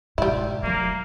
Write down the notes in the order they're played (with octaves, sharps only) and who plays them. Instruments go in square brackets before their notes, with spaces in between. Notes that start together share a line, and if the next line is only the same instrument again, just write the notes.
[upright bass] G#2 B2 [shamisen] G3 E4
[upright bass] F#3 A3 [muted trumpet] A#3